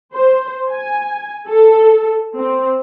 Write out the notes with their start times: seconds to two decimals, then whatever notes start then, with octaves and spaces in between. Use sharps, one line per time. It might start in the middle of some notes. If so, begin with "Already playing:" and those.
0.14 C5
0.72 G#5
1.49 A4
2.37 C4